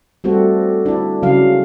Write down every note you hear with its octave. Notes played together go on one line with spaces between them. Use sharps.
G3 A3 C4 F#4 A4
D4 E4
C#3 F#3 F5